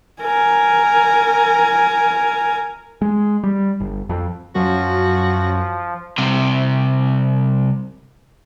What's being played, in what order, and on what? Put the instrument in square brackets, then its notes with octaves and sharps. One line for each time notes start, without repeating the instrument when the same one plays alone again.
[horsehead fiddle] A#4 G#5
[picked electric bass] G#3
G3
G1
F2
[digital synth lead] F#2 [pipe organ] F3 [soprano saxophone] F#4
[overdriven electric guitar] C2 C3